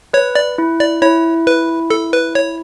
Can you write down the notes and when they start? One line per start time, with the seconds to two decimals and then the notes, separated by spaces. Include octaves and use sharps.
0.13 B4 C#5
0.35 D5
0.58 E4
0.80 D5
1.02 E4 C#5
1.47 B4
1.90 A4
2.13 B4
2.35 C#5